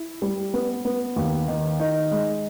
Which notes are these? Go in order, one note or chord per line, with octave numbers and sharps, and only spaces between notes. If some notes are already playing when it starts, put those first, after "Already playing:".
Already playing: E4
G3
B3
B3
D#2
D#3
D#4
G#3